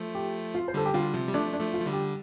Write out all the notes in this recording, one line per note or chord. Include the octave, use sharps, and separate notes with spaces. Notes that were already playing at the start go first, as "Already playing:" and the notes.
Already playing: F3 A3
G4
F4
C5
D3 G3 A4
G4
D3 G3 F4
C3 F3
G3
F3 A3 D4
D4
F3 A3
F4
F3
D3 G3
G4